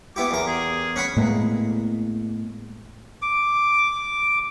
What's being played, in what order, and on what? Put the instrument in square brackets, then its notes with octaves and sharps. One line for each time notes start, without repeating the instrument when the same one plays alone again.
[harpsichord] B3 E4 G4 [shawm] D6
[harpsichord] E2 A#4
[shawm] G#4
[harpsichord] C#4 F#5 B5
[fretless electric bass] A2 G#3 A#3 B3
[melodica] D6